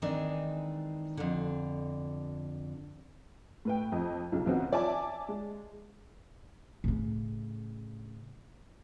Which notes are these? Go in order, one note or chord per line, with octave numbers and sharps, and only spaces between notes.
D#3 E3 G#3 C4 D4 D#4
F2 D3
A2 B4 G5
F2 D#5
B1 C#3
B1 E3 C4 C#4 F#4 D#5
C#5 D5 E5 G#5 A5 D6
G#3
A2 C#3